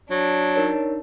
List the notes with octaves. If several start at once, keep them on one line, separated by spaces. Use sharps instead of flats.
F#3 D4
D#4 A#4 C#5